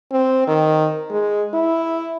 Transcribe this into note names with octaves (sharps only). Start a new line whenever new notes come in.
C4
D#3
G#3
E4